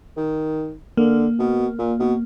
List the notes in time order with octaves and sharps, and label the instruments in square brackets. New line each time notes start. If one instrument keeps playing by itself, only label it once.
[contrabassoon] D#3
[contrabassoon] D3 [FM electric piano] A#3
[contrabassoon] B2
A#2
B2